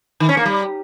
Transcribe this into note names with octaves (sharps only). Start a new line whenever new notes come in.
D#3
C#4
A#3
G3